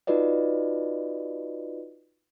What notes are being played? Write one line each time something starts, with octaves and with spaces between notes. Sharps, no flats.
D#4 F4 F#4 B4 D5 D#5